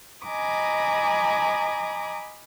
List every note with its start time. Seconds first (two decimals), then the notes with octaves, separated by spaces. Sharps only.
0.25 D#5 G#5 A#5 B5 D6 D#6